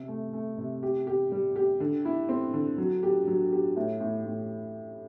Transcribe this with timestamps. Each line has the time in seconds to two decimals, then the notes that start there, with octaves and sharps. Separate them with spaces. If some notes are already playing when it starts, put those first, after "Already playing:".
Already playing: C3
0.08 A3
0.33 A3
0.58 C3
0.83 G4
1.07 G4
1.32 G3
1.56 G4
1.80 D3
2.05 E4
2.29 C4
2.54 D3
2.78 F#3
3.03 G4
3.27 F#3
3.52 G4
3.76 A2
4.00 A2
4.25 A2